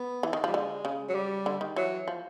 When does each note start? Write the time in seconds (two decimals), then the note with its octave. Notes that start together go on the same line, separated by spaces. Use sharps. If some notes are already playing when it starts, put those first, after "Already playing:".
Already playing: B3
0.23 E3
0.33 D#3
0.44 F3 G3
0.53 D3 G#3
0.85 C#3
1.09 F#3
1.15 G3
1.46 D3
1.61 D#3
1.76 E3 F#3
2.08 F3